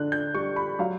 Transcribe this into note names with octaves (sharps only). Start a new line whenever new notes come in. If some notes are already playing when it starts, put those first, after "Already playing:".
Already playing: D3 F#6
G6
G3 C#6
B5
F#3 F5